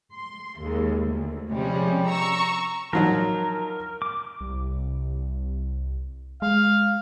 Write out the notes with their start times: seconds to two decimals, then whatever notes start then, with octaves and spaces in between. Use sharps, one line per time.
0.14 C6
0.60 D#2 G#3
1.05 D2
1.52 C3 F3 G3 G#3 C#4
2.07 A#5 C#6 E6
2.93 F3 F#3 D#4 A#4
4.02 D6
4.41 C2
6.42 G#3 F5